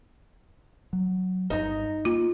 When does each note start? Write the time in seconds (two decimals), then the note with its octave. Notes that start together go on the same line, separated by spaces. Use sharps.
0.93 F#3
1.50 G1 G2 D#4 A#5
2.05 A#3 F4